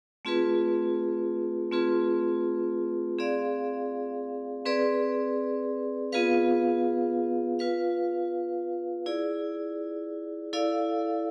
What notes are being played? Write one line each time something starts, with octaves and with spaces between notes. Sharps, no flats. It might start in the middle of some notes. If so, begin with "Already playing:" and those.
A3 C4 F4 G#4 B4
A3 C4 F4 G#4 B4
C4 G#4 D5 F5
C4 G#4 B4 D5
B3 F4 G#4 B4 F5
F4 B4 F5
E4 G#4 D5
E4 A4 D5 F5